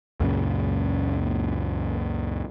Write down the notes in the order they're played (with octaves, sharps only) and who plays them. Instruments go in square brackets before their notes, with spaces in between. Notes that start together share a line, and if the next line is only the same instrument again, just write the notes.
[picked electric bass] C#2 F#2 A#2 C#3